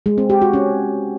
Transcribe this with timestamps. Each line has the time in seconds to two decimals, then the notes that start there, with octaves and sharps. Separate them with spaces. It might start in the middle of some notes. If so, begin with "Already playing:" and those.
0.06 G#3
0.18 C4
0.30 G4
0.42 F#4
0.53 C#4